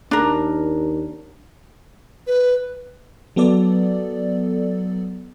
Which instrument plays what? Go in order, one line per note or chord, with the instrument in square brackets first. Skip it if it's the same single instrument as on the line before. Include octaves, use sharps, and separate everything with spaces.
[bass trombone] D#2 [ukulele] D4 A#4
[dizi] B4
[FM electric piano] F#3 B3 A4 D5